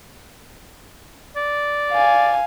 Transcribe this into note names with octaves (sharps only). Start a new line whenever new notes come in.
D5
F5 G#5